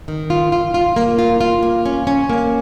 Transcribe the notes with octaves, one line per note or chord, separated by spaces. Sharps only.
D#3
F4
F4
F4
A#3
F4
F4
A#3
C#4
C#4
A#3